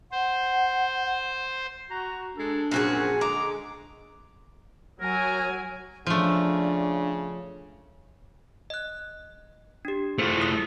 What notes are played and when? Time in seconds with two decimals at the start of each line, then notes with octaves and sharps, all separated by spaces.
0.12 C5 F#5
1.90 F#4 A#5
2.36 G#3 D4 A4
2.71 F#2 A#2 F3 C4 F#4 G#4
3.21 D3 G#3 A#5 D6
5.01 F#3 A#4 G#5
6.06 C#3 F3 A3 D4
8.70 D#5 F#6
9.85 D4 G4
10.19 A3 E4 F4 G#4 C5
10.38 E4 D#6